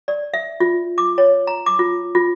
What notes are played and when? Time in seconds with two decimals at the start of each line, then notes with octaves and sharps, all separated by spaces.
0.08 D5
0.34 E5
0.60 F4
0.98 D6
1.18 C#5
1.47 A#5
1.66 D6
1.79 F4
2.15 F4